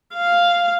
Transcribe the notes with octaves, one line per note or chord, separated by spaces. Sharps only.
F5